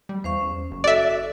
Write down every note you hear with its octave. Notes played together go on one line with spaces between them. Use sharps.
G3
E2 C5 F5 C#6
C#4
F#1
F#4 A4 D5 E5